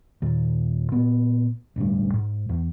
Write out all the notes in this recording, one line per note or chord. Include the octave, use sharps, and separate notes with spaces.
D#2 A#2
A#2 B3
E1 A1 D2 G2
G#2
E2